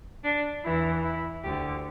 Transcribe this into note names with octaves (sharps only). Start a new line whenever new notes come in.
D4
E2 E3 E4
E4
D2 D3 G4